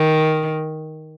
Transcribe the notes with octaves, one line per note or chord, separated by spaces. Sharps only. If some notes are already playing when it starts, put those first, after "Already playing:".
Already playing: D#3